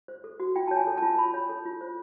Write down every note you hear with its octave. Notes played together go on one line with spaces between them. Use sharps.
C5
A4
F#4
F4 G5
C#5 A5
G#5
A4
F4 A5
F4 B5
C#5
A4
F4
C5